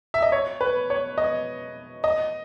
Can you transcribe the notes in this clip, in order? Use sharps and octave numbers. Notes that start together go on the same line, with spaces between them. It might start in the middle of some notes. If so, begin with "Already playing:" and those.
E5
D#5
C#5
B4
C#5
D#5
D#5